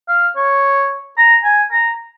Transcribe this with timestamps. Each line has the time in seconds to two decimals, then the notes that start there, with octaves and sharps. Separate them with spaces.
0.09 F5
0.36 C#5
1.17 A#5
1.44 G#5
1.71 A#5